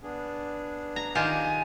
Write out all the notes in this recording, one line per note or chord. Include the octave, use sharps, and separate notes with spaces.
B3 D4 G#4
A#5
D#3 F4 G4 G#5